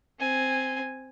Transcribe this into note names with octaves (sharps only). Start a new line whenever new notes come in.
C4 G#5